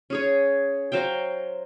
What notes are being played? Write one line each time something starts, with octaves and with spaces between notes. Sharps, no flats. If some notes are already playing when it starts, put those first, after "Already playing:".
C#4 G#4 C#5
F#3 C5 F5 G5